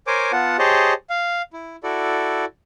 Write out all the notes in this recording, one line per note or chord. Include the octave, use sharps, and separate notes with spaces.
A#4 C5 C#5 G#5 D6
B3 F4 F#5 A5
G4 G#4 C5 C#5 D#5 A5
F5
E4
E4 F#4 A4 D5